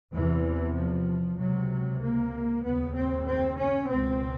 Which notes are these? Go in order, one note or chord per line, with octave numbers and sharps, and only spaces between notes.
E2 C3 E3
F3
C#2 C3 F#3
A#3
D#2 C#3 B3
C4
C4
C#4
C#2 B2 C4